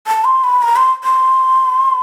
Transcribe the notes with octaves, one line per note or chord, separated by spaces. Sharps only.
A5
C6
B5
A#5
C6
C6